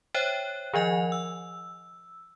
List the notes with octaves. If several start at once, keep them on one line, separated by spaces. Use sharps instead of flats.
C5 C#5 E5 G5 F#6
D#3 F3 D#5 G#5 F7
E6